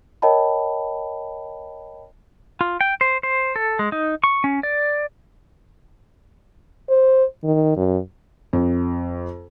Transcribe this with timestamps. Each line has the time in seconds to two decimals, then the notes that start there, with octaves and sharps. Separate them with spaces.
0.22 A#4 C#5 D#5 G5 A5 B5
2.61 F4
2.81 G5
3.01 C5
3.23 C5
3.56 A4
3.79 G#3
3.92 D#4
4.24 C#6
4.44 C#4
4.63 D5
6.89 C5
7.44 D#3
7.77 F#2
8.53 F2